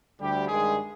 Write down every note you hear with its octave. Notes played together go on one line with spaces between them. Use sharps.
D2 D3 G3 G4
G2 D#3 G#3 G#4